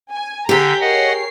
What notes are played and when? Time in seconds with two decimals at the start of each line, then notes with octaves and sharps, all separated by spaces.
0.11 G#5
0.49 D3 G4 G#4 A#5 G6 B6
0.81 A#4 C#5 D#5 F#5 C7